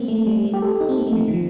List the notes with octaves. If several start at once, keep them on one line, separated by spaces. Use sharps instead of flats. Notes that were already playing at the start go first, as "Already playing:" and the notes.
Already playing: A#3 C4
A3
G3
A3
G4
A4
G4
D#4
C4
A#3
A3
F3
D#3
F3